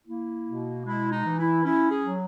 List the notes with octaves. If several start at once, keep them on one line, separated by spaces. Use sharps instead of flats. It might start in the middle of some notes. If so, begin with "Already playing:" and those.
A#3 E4
B2
G#3 E4
D#4
E3
E4
C#4 E4
G#4
F#3